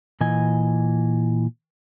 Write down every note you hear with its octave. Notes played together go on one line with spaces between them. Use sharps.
A#2 E3 D#5 G#5